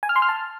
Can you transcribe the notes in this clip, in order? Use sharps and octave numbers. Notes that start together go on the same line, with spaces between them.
G#5
F6
C6
F6
A5